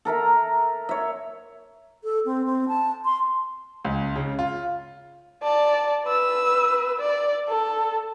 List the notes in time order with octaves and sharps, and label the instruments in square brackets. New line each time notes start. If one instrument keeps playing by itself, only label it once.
[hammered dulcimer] A4 A#4 E5 A#5
C#5 E5
[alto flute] A4
C4
C4
A5
C6
[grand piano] C#2
C#3
F4
[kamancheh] D5 A5
B4 E6
D5
A4